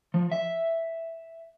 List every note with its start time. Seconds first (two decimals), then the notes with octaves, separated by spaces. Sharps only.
0.14 F3
0.32 E5